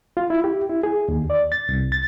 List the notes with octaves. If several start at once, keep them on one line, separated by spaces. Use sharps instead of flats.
F4
E4
G4
E4
G#4
D#2
D5
A6
C2
A6